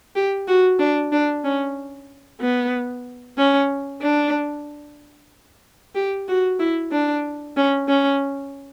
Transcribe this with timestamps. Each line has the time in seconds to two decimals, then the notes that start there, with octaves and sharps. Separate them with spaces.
0.16 G4
0.48 F#4
0.79 D4
1.12 D4
1.44 C#4
2.41 B3
3.37 C#4
4.02 D4
5.95 G4
6.28 F#4
6.59 E4
6.92 D4
7.57 C#4
7.88 C#4